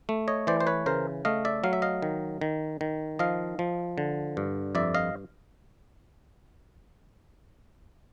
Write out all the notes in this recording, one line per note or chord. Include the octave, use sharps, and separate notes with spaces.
A3
C#5 D#5
E3 C5 D5
C5
B4 C#5
C#3 A#4 C5
A3 D#5 F5
D5 E5
F#3 F5
E5
D#5 F5
D#3
D#3
D#3
F3 D#5 F5
F3
D3
G2
F2 D5 E5
D#5 F5